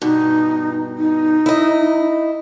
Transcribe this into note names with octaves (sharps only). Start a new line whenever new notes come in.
G2 B2 D#4
D#4
E4 D#5